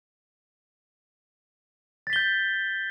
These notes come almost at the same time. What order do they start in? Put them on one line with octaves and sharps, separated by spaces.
A6 B6 G7 G6